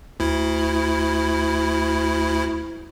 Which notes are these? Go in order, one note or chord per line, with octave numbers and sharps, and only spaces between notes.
D2 E4